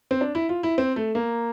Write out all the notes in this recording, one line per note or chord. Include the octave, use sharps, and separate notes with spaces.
C4
D4
E4
F4
E4
C4
A3
A#3